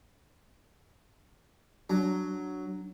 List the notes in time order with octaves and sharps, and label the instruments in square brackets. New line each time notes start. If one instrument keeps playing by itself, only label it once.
[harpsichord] F#3 [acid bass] D4